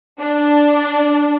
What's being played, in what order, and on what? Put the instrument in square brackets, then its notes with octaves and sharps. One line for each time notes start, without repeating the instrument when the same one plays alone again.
[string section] D4